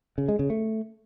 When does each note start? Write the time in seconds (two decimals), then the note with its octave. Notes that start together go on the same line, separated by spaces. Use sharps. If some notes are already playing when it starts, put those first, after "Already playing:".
0.18 C#3
0.28 G#3
0.39 C#3
0.50 A3